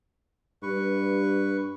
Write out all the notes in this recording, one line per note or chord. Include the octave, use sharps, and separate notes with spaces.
G2 B4 C#6